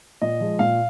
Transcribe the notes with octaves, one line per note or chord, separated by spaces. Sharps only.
A#2 D#5
F3 G#3
A#2 F5